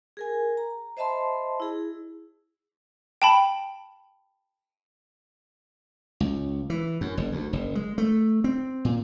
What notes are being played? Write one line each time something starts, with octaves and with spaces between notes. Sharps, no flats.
G#4 A#4 G#5
A#5
C5 D#5 E5 A5 B5 C6
E4 G#4
G5 A5 B5
C#2
E3
F#2
F#1
D2
F#1
G#3
A3
C4
A#2